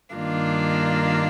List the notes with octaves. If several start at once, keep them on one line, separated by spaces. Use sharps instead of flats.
G2 D#3 A#3 D4 F4